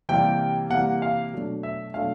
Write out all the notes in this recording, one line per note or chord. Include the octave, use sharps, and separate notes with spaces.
C3 E3 G3 A#3 G5
C3 E3 G3 A#3 F#5
F5
B2 F#3 A3 D4
E5
B2 F#3 A3 D4 F5